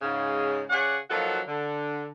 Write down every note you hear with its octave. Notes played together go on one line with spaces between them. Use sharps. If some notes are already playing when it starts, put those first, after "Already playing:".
G#2 C#3
C#3 G#4 C#5 D5 F#5
F3 F#3 A#3 D#4 F#4 A4
D3